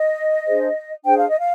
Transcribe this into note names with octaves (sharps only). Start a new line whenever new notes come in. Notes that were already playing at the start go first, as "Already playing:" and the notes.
Already playing: D#5
D4 G#4 C5
D4 G#4 C5 G5
F5
D#5
F5